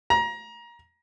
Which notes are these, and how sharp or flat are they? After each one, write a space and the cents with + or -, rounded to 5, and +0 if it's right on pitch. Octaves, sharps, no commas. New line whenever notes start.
A#5 +25